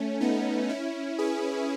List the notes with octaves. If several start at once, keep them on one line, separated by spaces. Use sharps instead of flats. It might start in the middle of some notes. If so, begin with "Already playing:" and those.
Already playing: A3 C#4
B3 D#4
C#4 E4
G#4 B4